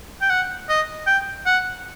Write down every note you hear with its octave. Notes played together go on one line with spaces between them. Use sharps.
G5
F#5
D#5
G5
F#5